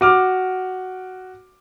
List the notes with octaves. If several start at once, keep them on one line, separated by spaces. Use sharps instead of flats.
F#4 D6 F6